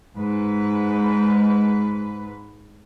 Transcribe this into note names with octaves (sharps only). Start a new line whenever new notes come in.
G#2 B4